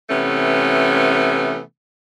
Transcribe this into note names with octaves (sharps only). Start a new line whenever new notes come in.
C3 E3 A3 B3 C#4